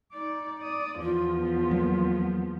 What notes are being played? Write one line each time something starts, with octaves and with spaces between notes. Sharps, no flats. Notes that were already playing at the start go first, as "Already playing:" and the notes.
D#4 D5
D5 D#6
E2 F3 B3 F4
F#3 A#3